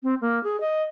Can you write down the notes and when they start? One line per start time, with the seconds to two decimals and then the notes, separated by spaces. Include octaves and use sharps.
0.03 C4
0.21 A#3
0.44 G#4
0.61 D#5